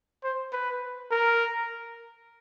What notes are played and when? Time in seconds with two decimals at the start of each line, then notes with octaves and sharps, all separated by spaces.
0.24 C5
0.53 B4
1.11 A#4